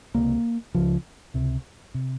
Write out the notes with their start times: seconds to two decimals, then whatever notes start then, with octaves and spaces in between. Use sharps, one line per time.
0.15 C#2 C3 A#3
0.74 C#2 C#3 F3
1.34 C#2 C3
1.94 C3